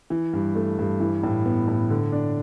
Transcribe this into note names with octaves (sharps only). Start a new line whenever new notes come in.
E3
G2
A3
G2
E3
A2
B3
A2
D3
D4